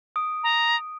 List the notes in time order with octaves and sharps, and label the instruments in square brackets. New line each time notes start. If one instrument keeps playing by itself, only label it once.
[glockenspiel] D#6 D7
[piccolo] A#5